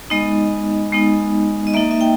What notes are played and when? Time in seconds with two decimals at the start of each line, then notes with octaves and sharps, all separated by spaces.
0.10 G#3 B3 D#4 D#5
0.92 G#3 B3 D#4
1.67 D#5
1.74 A#3 D#4 E5
1.91 E5
2.01 G5